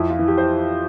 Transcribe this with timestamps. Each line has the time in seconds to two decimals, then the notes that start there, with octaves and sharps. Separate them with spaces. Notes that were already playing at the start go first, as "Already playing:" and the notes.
Already playing: F2 E4
0.10 F4
0.19 E3
0.28 G4
0.38 C5